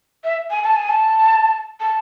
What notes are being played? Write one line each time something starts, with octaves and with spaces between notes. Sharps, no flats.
E5
G#5
A5
G#5
A5
A5